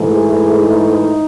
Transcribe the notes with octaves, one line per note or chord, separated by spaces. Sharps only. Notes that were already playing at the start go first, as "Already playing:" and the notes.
Already playing: G#2 E3 A3
G#4
D#4